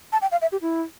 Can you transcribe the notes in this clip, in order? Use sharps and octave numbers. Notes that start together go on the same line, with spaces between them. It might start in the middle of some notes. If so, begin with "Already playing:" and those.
A5
G5
F5
E5
G4
E4